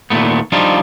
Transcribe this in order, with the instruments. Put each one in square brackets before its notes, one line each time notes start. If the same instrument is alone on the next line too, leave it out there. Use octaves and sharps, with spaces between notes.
[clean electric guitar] D#2 A#2 A3 B3
F3 G3 D4 D#4 F4